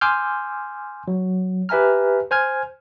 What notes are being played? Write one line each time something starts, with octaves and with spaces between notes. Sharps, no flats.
G#5 C6 D6 E6 F6 G6
F#3
G4 B4 E5 G#5 A#5 F6
C5 G#5 F6 G#6